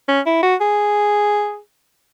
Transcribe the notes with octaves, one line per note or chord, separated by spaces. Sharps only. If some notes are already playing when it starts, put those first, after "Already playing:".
C#4
E4
F#4
G#4